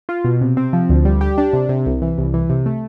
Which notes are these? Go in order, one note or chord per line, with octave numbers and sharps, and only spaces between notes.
F4
B2
C3
C4
F3
D2
G3
G4
D4
C3
C3
C2
E3
C2
E3
C3
A3